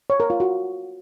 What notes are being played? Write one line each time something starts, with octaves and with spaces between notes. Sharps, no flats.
C#5
A#4
F4
F#4